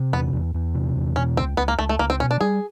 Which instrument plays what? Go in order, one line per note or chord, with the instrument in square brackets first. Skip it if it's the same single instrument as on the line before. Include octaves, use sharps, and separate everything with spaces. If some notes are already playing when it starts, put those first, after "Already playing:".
Already playing: [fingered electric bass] C3
[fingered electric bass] E2 [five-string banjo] B3
[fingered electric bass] E2
E2
C3
E2
[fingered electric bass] B2 [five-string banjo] C#4
[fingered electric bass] C#2 [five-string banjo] C4
[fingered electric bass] C#2 [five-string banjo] B3
[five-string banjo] A#3
[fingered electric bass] C#2 [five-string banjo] A3
[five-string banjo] A3
[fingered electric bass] C#2 [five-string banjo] A#3
[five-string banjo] C4
[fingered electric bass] B2 [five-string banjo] C#4
[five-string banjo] D4
[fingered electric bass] G3 [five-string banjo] G#4